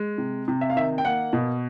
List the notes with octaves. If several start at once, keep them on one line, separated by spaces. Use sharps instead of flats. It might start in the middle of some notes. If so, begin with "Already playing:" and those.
Already playing: G#3
C3
C3
E5
F5
D#3 E5
G5
A#3 F#5
B2